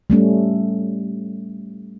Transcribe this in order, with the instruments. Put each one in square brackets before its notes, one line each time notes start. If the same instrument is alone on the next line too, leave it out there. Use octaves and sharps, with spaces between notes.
[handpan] G3 A3 C#4